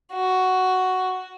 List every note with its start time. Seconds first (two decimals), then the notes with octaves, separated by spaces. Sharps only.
0.13 F#4